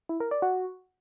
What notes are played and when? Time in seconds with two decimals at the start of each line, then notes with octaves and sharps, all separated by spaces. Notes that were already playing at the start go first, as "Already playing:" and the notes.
0.09 E4
0.20 A#4
0.31 D5
0.42 F#4